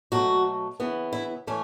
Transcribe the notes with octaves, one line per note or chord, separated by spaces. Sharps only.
B2 F#3 A3 F#4
C#3 E3 B3
E4
E3 A3 C#4